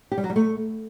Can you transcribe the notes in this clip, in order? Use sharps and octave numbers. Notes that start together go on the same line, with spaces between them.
G4
G3
F#3
G3
A3